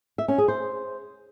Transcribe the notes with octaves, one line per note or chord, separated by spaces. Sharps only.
E5
C#4
G#4
C5